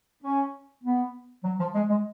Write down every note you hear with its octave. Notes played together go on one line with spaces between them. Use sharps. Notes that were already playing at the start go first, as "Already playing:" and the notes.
C#4
B3
F#3
F3
G#3
G#3